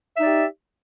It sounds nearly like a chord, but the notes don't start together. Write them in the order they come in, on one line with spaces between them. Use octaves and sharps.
E5 D#4 D5 G4